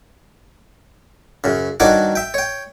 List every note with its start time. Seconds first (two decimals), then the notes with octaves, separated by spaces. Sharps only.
1.44 F#2 C#3
1.80 G2 D#3 D4 F#4 C#5 D6
2.15 E5 G5
2.34 C#5 G5